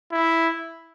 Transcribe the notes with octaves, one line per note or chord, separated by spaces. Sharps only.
E4